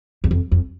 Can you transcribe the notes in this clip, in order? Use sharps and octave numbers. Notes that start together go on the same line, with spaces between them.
E2
F2
F2